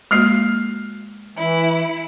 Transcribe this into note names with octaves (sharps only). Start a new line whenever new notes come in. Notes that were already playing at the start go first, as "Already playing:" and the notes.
G#3 A#3 F#4 F6 C7
E3 E4